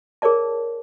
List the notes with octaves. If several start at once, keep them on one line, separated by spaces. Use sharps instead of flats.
G#4 A#4 C#5 D5 A5